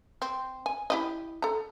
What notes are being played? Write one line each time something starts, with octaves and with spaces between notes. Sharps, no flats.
C4
G#5
E4 G4 D#5
A4 A#5